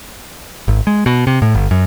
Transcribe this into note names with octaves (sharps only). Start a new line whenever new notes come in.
G#1
G#3
B2
C3
A2
G1
F#2